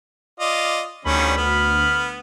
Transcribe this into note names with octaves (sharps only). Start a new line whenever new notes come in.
F4 D5 D#5
D2 D#3 G3 C#4 B5
B3 F6